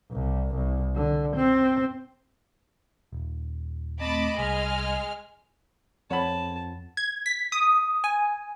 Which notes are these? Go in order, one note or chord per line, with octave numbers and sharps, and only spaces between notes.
C2
C2
D3
C4
D#1
A3 C4 D#5 A5 B5 D6
C2 G#3 G#5 F6
F2 C#5 F#5 A5 B5
G#6
B6
D#6
G#5